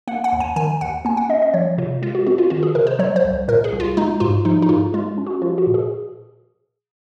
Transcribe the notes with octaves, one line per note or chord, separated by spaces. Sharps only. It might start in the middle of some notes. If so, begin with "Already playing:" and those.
A#3 F#5
F#5
D#2
G#5
D#3 G#5
D#2 F#5
A#3 G#5
F#5
C#4 D#5
D#5
F3 C#5
C3 F4
G#3 F4
F#4
C4 F#4
F4
D#3 F#4
G#4
C3 A#4
C5
F#3 C#5
C5
C2
A#2 A#4
G#4
C2
F4
G#3 D#4
G#2 F4
F3 D#4
D#4
G#2 F4
G#3 F4
C#4
F#4
F3 F4
F#4
A#2
G#4